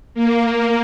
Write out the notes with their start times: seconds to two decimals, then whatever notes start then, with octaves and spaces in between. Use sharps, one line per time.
0.14 A#3